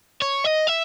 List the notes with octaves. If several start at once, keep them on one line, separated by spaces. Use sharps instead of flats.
C#5
D#5
E5